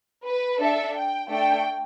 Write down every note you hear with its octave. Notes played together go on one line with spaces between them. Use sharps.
B4
D4 A4 E5
G5
A3 D4 A4 G5